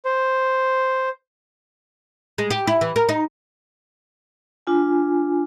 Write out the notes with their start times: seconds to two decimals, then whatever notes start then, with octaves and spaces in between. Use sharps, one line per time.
0.05 C5
2.38 G#3
2.50 G4
2.67 E4
2.81 E3
2.96 A#4
3.09 D#4
4.67 D4 F4 G#5